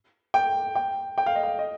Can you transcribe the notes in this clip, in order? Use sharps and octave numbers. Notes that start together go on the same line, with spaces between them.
G5
G5
G5
F5
D#5
F5
D#5